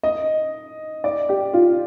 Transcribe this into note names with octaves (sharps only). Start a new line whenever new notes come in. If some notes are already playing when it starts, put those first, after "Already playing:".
D#5
D5
G4
F4